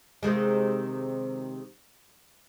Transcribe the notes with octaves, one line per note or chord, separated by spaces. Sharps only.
C3 D#3 G#3